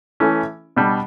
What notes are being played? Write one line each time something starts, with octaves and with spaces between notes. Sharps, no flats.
E3 A3 C#4 E4
B2 G3 D4